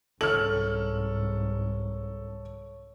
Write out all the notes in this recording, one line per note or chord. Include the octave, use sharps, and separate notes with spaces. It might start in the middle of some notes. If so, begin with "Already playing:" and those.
C2 G#2 A4 C#5 C#6 F6 F#7